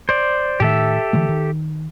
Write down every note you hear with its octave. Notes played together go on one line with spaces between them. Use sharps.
C5 D5
A2 D#3 G4 A4 E5
D3 E3 A3
D#3